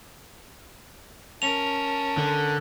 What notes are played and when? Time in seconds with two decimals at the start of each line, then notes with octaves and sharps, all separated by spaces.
1.42 C#4 A#4 A5 F7
2.17 D3